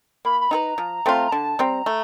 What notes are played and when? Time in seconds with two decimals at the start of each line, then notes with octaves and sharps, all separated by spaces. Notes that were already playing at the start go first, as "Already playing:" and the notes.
0.25 A#3 B5
0.41 B5
0.51 D#4 G#4 B4 A#5
0.78 F3
1.06 A3 C4 F4
1.28 A#5
1.32 D3 A5
1.59 G3 C4 A#5
1.86 A3